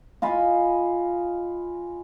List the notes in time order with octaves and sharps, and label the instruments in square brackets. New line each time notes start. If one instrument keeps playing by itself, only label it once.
[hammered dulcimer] F4 D#5 G#5 B5